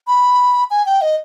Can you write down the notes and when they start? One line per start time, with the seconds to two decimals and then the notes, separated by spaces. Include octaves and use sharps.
0.07 B5
0.71 G#5
0.86 G5
1.01 D#5